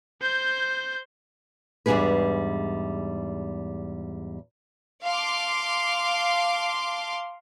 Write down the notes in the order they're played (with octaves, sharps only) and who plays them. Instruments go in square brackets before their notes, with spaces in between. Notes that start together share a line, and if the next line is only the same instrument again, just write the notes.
[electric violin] C5 G6
[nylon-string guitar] E2 G#2 G3 D4 G#4 B4
[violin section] F5 A5 C6 D6